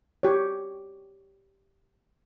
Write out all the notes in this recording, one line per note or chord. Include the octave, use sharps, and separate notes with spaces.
G4 C#5